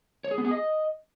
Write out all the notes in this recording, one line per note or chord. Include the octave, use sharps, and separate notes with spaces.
C#5
G#4
B3
G#4
D#5